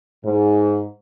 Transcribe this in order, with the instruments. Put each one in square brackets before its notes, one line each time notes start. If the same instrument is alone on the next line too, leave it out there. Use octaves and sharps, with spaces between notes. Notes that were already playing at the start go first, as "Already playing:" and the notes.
[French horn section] G#2